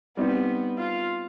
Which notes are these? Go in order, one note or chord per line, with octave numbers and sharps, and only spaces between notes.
G3 B3 C4 D#4
F4